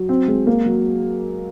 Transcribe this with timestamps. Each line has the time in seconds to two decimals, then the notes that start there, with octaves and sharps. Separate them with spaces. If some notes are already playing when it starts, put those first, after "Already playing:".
Already playing: F#3
0.09 C4
0.28 G#3
0.47 A#3
0.66 F#3